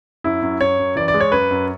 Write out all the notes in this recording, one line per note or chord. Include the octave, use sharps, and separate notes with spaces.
F#2 E4
F#2
F#2 C#5
F#2
E3 D5
D5
G#3
C#5
F#2 B4
F#2